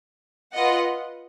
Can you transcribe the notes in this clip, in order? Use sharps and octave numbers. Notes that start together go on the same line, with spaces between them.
F4 B4 D#5 F#5